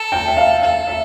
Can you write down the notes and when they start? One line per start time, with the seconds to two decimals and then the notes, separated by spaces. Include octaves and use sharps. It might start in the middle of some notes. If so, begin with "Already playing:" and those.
Already playing: A4
0.12 G5
0.27 E5
0.37 F5
0.62 A4 F5
0.87 E5